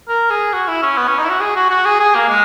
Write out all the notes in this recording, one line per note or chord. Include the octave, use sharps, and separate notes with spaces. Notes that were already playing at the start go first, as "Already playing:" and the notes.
A#4
G#4
F#4
E4
C#4
B3
C#4
D#4
E4
F#4
G#4
F#4
F#4
G#4
G#4
A#3
G#3